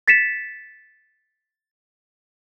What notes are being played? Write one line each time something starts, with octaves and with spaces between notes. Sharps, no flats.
A6 B6 C#7 E7